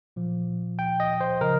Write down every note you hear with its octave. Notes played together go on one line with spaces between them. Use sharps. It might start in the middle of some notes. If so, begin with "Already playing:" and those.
A#2 F3
G5
D#5
C5
C#3 F3 A#4